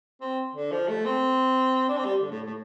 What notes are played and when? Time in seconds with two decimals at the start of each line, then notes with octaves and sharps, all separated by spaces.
0.21 C4
0.55 D3
0.72 F3
0.88 A3
1.05 C4
1.89 D4
1.97 C4
2.05 G3
2.22 D3
2.30 A2
2.47 A2